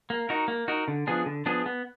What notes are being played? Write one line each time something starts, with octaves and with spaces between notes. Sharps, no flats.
A#3
D#4 F#4 A#4
A#3
D#4 F#4 A#4
D3
F3 B3 D4 G#4
D3
F3 B3 D4 G#4
B3